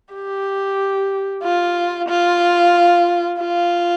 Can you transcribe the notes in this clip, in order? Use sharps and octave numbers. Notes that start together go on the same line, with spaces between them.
G4
F4
F4
F4